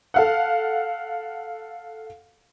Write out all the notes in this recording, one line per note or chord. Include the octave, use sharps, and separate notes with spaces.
A4 F5 F#5